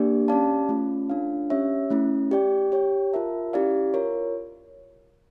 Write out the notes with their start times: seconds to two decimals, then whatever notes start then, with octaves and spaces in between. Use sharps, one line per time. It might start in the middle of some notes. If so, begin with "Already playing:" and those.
Already playing: A#3 D4 G4 D5
0.28 C#4 G4 D5 F5 A5
0.69 A3 C#4 F4
1.09 D4 F4 A4 C#5 F5
1.50 C#4 G4 C#5 E5
1.90 A3 C#4 E4
2.31 G4 D5 G5
2.72 G4 C#5 G5
3.13 F4 A#4 E5 A5
3.53 C#4 E4 G4 D5 F5
3.94 F4 A#4 C#5